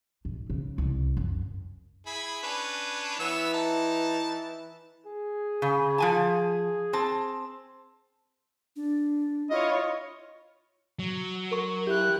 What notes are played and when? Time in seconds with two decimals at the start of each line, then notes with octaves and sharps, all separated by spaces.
0.25 B1
0.50 C#3
0.78 C2
1.17 F#2
2.06 E4 G#4 B5
2.43 C#4 D4 B4
3.20 E3 B3 C#5 E6
3.54 D#4 A5
5.06 G#4
5.62 C#3
5.98 F3 G#5 A5
6.93 C4 A5
8.76 D4
9.50 E4 F4 C#5 D#5
10.99 F#3
11.51 A#4 C#6
11.87 E4 G4 F#6